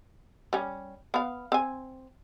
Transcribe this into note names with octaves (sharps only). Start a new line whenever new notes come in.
G3 C#4
B3 F5
C4 G#5